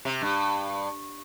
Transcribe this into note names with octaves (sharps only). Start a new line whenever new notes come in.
C3
G2